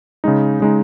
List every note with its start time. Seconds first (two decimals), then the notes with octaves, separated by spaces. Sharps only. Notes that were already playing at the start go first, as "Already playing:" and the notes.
0.24 C#3 G#3 D#4
0.60 C#3 G#3 D#4